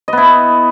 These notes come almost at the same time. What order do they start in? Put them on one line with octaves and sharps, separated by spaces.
D#5 B3 E4